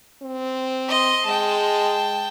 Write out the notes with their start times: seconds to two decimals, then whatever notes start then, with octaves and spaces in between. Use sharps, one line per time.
0.22 C4
0.88 D#5 C6
1.26 G#3 G5 A5